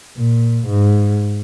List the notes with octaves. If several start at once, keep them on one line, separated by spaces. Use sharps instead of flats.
A#2
G#2